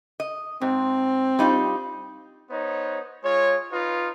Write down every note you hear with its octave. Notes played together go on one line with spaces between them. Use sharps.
D#5
G#2 C4
G3 D#4 F4
B3 D#4 C5 C#5
G#3 F4 C#5
D#4 F4 B4